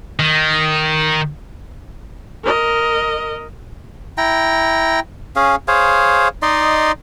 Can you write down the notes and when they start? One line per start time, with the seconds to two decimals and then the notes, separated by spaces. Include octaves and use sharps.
0.19 D#3
2.44 A#4 D#5
4.18 E4 G5 A#5
5.36 C#4 G#4 F5
5.68 G#4 C5 C#5 F5
6.42 D#4 D5 D#5 C6